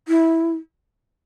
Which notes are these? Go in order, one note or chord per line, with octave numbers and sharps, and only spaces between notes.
E4